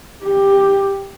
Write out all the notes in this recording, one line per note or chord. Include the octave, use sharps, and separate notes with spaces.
G4